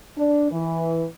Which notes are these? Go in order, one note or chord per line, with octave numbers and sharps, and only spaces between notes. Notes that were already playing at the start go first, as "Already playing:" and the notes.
D4
E3